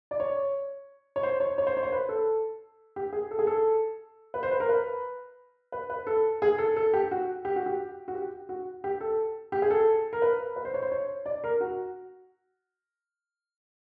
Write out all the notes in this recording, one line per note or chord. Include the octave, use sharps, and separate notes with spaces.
D5
C#5
C#5
C5
C#5
C#5
C5
C#5
C5
B4
A4
G4
G#4
A4
G#4
A4
B4
C5
B4
A#4
B4
B4
B4
A4
G#4
A4
A4
G4
F#4
G4
F#4
G4
F#4
G4
F#4
G4
A4
G4
G#4
A4
A#4
B4
B4
C5
C#5
C5
C#5
D5
A#4
F#4